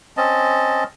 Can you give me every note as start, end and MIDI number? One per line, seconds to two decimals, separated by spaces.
0.17 0.84 60
0.17 0.84 61
0.17 0.84 75
0.17 0.84 81